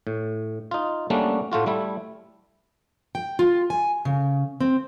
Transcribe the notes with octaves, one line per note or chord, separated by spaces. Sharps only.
A2
D#4 F4
G3 A3 A#3 C#4 D4 F#4
A2 A3 F4 F#4
G3 A3 E4
G5
F4
G#5
C#3
C4